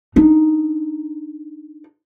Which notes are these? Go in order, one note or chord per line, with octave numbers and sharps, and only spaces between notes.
D4 D#4